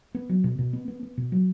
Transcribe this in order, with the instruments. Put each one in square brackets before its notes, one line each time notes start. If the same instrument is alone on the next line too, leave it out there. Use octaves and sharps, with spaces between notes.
[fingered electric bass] B3
F#3
B2
B2
B3
B3
B3
B2
F#3